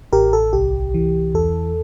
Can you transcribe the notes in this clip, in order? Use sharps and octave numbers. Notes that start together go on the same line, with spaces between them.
A1 G4 A#4
A4
C2 G4
E3
E2 A4